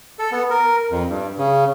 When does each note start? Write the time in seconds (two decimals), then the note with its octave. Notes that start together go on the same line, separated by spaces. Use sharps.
0.19 A4
0.32 B3
0.50 A#4
0.91 F2
1.09 G2
1.38 C#3